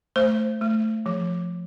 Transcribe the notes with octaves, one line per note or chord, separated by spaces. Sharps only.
A3 C5
A3
F3